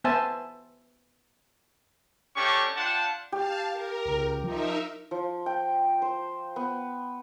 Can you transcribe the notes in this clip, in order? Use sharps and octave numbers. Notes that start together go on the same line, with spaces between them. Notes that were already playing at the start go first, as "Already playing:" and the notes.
B3 C5 E5 G#5 A5
A3 C#4 D4 G4 C#6
D4 F4 F#5 G5 A5
G4 F5 A5
A#4
C#2
F3 D#4 A#4 E5
F3
G5
C5
B3